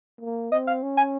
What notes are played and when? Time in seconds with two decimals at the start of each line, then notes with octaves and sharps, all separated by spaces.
0.21 A#3
0.51 C4 D#5
0.67 F5
0.82 C#4
0.97 G#5